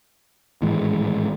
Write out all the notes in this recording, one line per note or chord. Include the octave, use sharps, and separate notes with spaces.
G#1 A2 E3 G#3